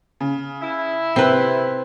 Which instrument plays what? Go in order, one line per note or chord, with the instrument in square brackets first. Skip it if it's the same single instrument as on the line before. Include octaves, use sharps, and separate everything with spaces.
[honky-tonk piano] C#3
[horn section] E4
[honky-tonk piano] C3 [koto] C4 B4